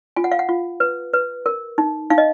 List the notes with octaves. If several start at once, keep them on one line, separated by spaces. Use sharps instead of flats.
F4 G#5
F#5
F5
F#5
F4
B4
B4
A#4
D#4
D#4 F5
D#5